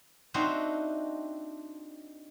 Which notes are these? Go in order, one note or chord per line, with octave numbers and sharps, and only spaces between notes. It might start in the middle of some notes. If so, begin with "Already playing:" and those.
C4 D4 D#4 F#4 C5 E5